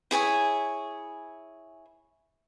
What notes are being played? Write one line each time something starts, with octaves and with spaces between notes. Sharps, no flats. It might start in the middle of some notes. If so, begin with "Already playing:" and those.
E4 G#4 C#5 G#5